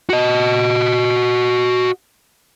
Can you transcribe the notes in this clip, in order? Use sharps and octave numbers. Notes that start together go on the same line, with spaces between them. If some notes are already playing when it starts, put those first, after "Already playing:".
F#4 D#5